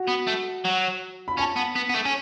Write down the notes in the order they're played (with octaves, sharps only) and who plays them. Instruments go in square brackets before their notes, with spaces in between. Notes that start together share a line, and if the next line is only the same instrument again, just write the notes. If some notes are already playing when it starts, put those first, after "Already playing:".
Already playing: [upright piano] F#4
[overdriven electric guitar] B3
A3
F#3
[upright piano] B5
[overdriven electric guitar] C#4 [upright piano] A5
[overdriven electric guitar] B3
B3
B3
A3
C#4